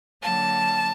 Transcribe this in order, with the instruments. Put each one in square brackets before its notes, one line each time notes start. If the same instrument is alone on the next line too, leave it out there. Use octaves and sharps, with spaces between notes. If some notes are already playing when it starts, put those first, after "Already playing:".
[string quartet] D3 F#3 A#3 A5